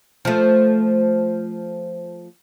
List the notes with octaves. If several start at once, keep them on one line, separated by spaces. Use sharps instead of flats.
F3 A3